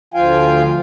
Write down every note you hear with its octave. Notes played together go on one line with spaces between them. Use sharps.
D2 F3 F4 F5 G5 G#5